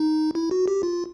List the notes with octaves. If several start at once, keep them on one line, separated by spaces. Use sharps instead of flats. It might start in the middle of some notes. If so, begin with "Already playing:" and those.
Already playing: D#4
E4
F#4
G4
F4